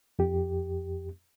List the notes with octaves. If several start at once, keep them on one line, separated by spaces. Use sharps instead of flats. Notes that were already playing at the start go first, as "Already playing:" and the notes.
F2 G4